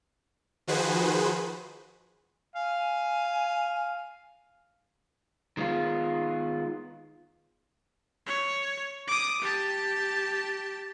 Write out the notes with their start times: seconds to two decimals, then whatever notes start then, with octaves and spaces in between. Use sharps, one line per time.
0.67 D#3 F3 F#4 G#4 B4 C5
2.55 F5 G#5
5.57 D#3 G#3 B3 F4
8.26 C#5
9.08 D6 D#6
9.41 G4 A5